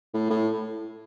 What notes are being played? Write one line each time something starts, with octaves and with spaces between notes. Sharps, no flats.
A2
A2